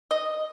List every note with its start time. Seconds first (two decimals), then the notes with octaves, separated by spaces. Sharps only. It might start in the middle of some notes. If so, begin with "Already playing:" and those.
0.11 D#5